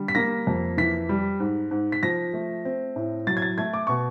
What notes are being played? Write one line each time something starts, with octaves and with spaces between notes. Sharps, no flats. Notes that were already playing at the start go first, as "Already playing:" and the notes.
Already playing: D3 G3
B6
A#3 A#6
F2
E3 B6
G3
G#2
G#2
B6
F3 A#6
A3
C4
A2
F#3 A6
G#6
A6
A3 G#6
D6
B2 C#6